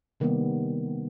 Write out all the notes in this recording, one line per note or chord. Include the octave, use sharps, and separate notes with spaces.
C3 D#3 G3 A#3 B3